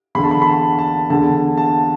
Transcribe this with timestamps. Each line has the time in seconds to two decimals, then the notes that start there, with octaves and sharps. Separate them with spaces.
0.15 E2 D3 B5
0.23 A5
0.31 B5
0.42 B5
0.47 A5
0.79 A5
1.10 E2 D3 A5
1.58 A5